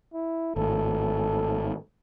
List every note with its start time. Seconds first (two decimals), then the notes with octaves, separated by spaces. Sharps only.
0.14 E4
0.56 G#1 A2 A4